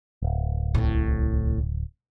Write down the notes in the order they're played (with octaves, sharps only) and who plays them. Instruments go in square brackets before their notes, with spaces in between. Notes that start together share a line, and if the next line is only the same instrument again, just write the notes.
[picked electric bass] D1
[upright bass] C2 A2